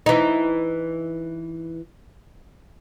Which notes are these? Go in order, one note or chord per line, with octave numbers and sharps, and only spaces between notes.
E3 D#4